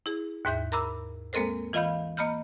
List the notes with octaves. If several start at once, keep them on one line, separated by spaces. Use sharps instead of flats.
E4 G#4
D#2 G#2 E5 G6
A#4 A#5 B5 D6 E6
G#3 A#3 C4 A4 A#4 C5
E3 F4 D#5 F5 B5 G6
A#3 D#5 B5 F6 G6